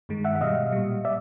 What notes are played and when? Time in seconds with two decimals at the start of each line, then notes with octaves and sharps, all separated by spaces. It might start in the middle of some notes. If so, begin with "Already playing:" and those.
0.09 G2 D#3 G#3
0.24 E5 F#5
0.35 E5
0.41 B2 G3 D#5 F5
0.72 A#2 G3
1.05 D5 E5